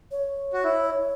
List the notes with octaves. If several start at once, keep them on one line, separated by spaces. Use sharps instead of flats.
C#5
F#4
E4
C#5